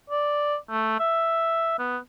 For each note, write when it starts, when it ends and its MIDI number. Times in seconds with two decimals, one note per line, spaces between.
0.10 0.56 74
0.70 0.96 57
0.99 1.78 76
1.79 1.97 59